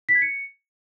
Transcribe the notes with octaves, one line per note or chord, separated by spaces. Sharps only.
B6
G#6
C#7